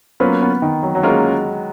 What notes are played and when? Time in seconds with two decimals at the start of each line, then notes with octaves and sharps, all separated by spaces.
0.20 F#3 A#3 B3 C#4 F4 B4
0.41 B3
0.62 D#3
0.83 F#3
0.95 F#3
1.03 G#3 A#3 C#4 F4 A#4